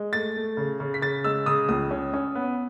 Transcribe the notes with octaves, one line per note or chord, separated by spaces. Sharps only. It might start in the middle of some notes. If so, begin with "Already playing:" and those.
Already playing: G#3
A3 A6
A3
C#3
C#3
B6
C#3 A6
G#3 E6
C#3 D#6
C#2 D#6
C#4
C#4
B3